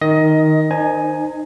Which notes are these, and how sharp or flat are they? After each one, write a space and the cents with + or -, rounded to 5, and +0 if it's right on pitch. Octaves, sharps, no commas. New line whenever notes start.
D#3 +0 D#5 +20
D#4 -35 C5 -10 G#5 +5